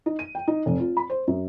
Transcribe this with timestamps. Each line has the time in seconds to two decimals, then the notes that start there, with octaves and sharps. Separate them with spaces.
0.06 D#4
0.19 D#7
0.35 G5
0.48 D#4
0.66 F1
0.80 F4
0.97 B5
1.10 C5
1.27 F#2